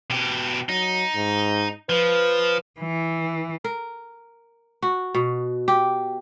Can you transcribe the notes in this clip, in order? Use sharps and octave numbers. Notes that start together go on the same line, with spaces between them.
B2 G4
F#3 D#4
G#2
F3 B4
E3
A#4
F#4
B2
G4